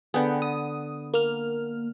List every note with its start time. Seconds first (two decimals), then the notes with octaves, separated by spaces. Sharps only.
0.14 D3 B3 G#4 B4 G5
0.42 D#6
1.14 A#3 F6